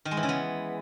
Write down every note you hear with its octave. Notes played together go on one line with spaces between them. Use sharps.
D#3
G#3
E3
C#3
B3